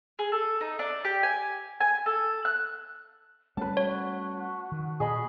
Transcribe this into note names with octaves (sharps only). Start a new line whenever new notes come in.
G#4
A4
D#4
D4
G4
G#5
G#5
A4
F#6
G3 A3 C#4 B4 C#5 A5
F#4 C#5
D#3
A#2 G#4 D#5 B5